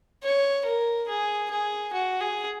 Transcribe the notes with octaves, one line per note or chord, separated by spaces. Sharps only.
C#5
A#4
G#4
G#4
F#4
G#4